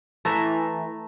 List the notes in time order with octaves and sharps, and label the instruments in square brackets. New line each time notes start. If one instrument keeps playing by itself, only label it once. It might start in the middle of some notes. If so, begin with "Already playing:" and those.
[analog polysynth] E3 [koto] A3 E5 [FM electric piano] A5 A#5